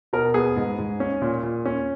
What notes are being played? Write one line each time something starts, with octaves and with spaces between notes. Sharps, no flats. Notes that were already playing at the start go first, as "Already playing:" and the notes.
B2 A#4
B3 G#4
G#2
G#2
C#4
A#2
A#2
C#4